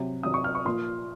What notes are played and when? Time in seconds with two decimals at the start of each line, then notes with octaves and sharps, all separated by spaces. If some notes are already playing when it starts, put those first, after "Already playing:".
Already playing: C3 F#3
0.23 C3 F#3 D#6
0.34 C#6
0.44 F6
0.55 C#6
0.65 A#2 F3 C6